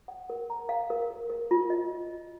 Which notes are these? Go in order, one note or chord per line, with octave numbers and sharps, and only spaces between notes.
F#5
A#4
A#5
F5
A#4
A#4
A#4
F4
D#5